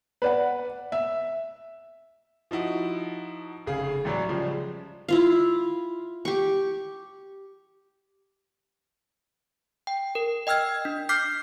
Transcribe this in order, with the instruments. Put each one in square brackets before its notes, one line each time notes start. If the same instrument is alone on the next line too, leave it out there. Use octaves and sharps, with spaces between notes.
[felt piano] B4 D5 F#5
E5
[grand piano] F3 D#4 E4 F#4
F1 C#3 G#4 F5
A1 A2 F#3 C#4 D5
C#3 F3 G3 G#3
[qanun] E4 F4 F5
G4 C#6
[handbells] G5
A#4
D#5 G5 E6 F6 G#6
D4
D6 F6 G6 B6 C7